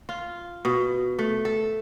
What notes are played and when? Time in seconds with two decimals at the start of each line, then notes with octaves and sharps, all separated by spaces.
0.09 F4
0.65 B2
1.19 A3
1.45 A4